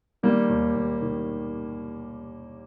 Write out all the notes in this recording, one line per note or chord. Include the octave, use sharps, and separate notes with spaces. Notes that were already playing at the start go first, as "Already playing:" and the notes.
D#3 G3 A#3
D#2
D#2
D#3